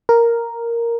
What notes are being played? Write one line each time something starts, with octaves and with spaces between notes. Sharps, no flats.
A#4